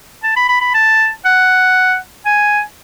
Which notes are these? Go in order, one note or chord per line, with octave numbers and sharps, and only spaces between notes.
A5
B5
B5
B5
A5
F#5
G#5